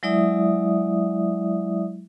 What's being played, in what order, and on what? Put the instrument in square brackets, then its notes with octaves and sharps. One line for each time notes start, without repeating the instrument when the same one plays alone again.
[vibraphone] F#3 G#3 E4 D5 E5 D#6